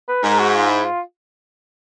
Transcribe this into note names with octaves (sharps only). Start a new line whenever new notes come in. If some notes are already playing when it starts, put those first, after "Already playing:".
B4
G#2 A#4
F#4
F4
E4
F4